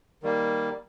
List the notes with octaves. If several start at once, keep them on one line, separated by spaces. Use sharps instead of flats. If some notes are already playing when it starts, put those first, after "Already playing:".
D#3 G3 A#3